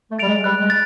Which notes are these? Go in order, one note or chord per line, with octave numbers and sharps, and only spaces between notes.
A3
G3 A6 D7 F7
G#3
G3 F#6
G#3
A6